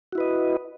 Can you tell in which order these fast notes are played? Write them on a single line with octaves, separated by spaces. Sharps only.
F#4 E4 B4 D#5